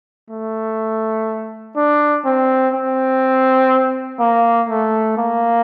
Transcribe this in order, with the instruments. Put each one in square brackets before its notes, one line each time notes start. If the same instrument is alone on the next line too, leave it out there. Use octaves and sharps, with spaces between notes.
[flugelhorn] A3
D4
C4
C4
A#3
A3
A#3